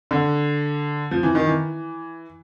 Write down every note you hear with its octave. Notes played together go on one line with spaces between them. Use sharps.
D3
F3
E3
D#3
E3